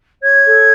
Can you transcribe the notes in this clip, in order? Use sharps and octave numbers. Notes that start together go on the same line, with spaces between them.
C#5 G#6
A4